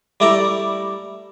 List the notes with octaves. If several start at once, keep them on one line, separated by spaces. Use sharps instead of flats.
G3 A3 E4 D5 A#5